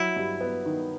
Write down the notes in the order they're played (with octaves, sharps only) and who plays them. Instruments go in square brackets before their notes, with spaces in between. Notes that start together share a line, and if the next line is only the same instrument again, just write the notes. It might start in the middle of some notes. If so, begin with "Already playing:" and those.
Already playing: [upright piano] F#3 [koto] E4
[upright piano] G2
B3
D#3